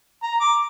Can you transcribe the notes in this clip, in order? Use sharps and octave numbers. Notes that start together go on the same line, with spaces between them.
A#5
D6